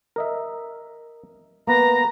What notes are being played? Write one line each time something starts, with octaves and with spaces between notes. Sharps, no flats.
A#4 D#5 E5
A#3 B3 B4 A#5